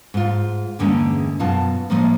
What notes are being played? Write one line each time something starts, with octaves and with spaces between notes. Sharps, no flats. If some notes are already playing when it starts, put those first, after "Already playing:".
G#2 F4
E2 G2 D3 G#3 A#3 C#4
F#2 B2 F4 F5 A5
A2 F3 G#3 A#3